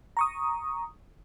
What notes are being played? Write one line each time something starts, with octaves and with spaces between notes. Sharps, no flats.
A#5 C#6 D#6